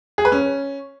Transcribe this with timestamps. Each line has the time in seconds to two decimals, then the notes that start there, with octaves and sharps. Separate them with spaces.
0.18 G#4
0.25 B4
0.32 C#4